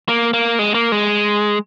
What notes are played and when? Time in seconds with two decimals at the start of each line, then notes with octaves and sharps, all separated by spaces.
0.08 A#3
0.34 A#3
0.59 G#3
0.74 A#3
0.92 G#3